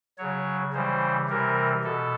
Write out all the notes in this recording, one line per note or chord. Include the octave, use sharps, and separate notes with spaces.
C#3 F#3 C#5
C#3 E3 G3 C5
C3 E3 G3 A#4
B2 A4